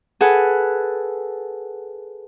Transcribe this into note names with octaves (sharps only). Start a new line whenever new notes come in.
G#4 A4 B4 F#5